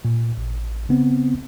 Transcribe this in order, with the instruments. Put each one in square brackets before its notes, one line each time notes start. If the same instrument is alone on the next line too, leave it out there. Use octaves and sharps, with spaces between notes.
[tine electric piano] A#2
A1
C#3 B3 C4